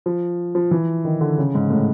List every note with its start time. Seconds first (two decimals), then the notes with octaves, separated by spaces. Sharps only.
0.06 F3
0.55 F3
0.71 E3
1.05 D#3
1.21 D3
1.38 C#3
1.55 G#2
1.70 A2